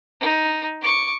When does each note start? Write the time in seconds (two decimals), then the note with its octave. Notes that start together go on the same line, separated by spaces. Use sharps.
0.20 D#4
0.81 C#6 D6